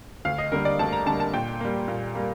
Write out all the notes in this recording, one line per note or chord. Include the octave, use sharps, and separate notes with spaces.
D2 F5
D#5
D3 G3 A#3 A#4
D5
D2 A5
A#5
D3 G3 A#3 A5
A5
A#2 G5
G3 A#3
A#2
G3 A#3